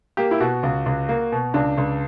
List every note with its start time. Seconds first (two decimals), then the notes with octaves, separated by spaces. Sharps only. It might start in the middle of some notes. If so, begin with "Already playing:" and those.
0.17 A#3 G4
0.31 E4
0.40 B2 F#4
0.63 C#2
0.86 C#2
1.09 A#3
1.32 B2
1.54 C#2 D4
1.78 C#2